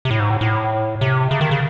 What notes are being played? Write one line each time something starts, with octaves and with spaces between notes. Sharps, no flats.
C3
A2
G#2
A2
A2
C3
C#3
D#3
C#3